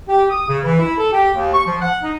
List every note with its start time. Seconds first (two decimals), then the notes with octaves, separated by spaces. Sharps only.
0.08 G4
0.30 D#6
0.48 C#3
0.64 E3
0.79 E4
0.98 A4
1.12 G4
1.34 D#2
1.53 C#6
1.66 F3
1.82 F#5
2.03 D#4